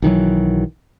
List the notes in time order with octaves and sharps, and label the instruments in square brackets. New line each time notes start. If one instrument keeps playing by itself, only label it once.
[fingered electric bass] B1 D#3 E3 F#3